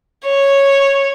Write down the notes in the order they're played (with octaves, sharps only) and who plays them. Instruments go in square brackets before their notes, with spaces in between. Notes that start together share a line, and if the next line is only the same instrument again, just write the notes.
[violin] C#5